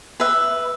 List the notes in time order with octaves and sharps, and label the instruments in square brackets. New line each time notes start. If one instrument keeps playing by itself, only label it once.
[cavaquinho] B4 E5